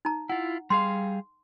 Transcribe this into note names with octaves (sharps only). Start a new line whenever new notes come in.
D#4 A#5
E4 F4 F#5
G3 G#4 F5 C6